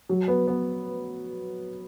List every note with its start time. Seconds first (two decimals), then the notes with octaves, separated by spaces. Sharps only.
0.09 F#3
0.28 B3
0.47 B3